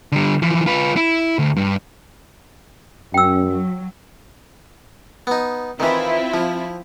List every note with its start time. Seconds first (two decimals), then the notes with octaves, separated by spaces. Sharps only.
0.12 D3 G3
0.42 E3 F3
0.66 F4 B4
0.96 E4
1.39 D2
1.56 G2
3.14 F#2 C#4 G5 E6
3.46 F#3
5.27 B3 D#4
5.80 D#3 E3 C4 E4 F4
6.34 F3